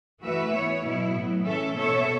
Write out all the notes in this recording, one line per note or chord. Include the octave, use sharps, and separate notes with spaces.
E3 A3 F#4 B4 E5
B3 E4 C#5
B2 F#3 B3 E4
A2 F#3 B3
E3 C#4 A4 E5
B2 B3 A4 C#5 E5